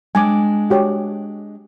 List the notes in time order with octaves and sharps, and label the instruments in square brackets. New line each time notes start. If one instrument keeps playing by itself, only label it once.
[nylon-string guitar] G#3 D4 G5 [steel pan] G#5 D6
[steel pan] F#4 G4 C#5